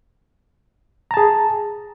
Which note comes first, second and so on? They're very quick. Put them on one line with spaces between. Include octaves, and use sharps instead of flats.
A#5 A5 G#4